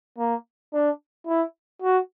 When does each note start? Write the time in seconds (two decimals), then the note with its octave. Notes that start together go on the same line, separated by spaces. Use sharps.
0.18 A#3
0.73 D4
1.27 E4
1.82 F#4